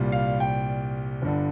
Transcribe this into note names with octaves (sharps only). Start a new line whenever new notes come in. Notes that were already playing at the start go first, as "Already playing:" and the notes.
Already playing: C2 A#2 G3
F5
G5
G1 G2 D3